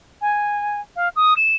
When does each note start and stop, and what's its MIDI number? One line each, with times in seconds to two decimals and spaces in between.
0.21 0.80 80
0.96 1.08 77
1.16 1.34 87
1.36 1.56 100